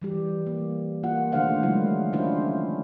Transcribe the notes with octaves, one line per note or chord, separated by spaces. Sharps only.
E3 G3 G4
A#3
A#3 F4 F#5
D#3 A3 D4 C5 F5 F#5
C#3 F#3 G#3 E4 F4
C#4 D4 E4 F4 C5